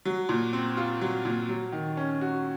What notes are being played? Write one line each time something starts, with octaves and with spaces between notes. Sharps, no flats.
F#3
A#2
C4
F4
F#3
A#2
F#3
D#3
C#4
F#4